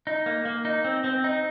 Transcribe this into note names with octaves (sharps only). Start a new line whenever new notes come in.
D#4
A#3
A#3
D#4
C4
C4
D#4